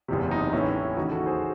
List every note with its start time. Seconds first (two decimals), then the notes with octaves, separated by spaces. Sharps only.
0.08 F#1 E2 C3
0.31 D#4
0.53 A1 A2 E3 C#4 E4
0.97 D#2 C#3 E3 D#4 F#4
1.11 F#4 A4
1.26 G#4 C5